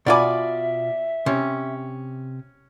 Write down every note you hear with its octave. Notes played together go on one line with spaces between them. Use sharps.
B2 F4 D5 E5 G#5 B5 D6
C3 C#4